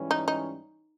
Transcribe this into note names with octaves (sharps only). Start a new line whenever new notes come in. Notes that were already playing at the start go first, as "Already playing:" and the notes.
Already playing: G#2 E3 G3 C#4
D#4
D#4